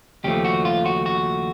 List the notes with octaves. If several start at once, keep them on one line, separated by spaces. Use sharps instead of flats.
D#2 C#3 F3 G3 A3 G4
F#4
F4
F#4
F#4